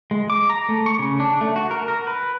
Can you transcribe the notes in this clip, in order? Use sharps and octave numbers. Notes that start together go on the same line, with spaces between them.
G#3
D6
A#5
A3
C#6
C#3
D4
A3
F#4
A#4
A#4
B4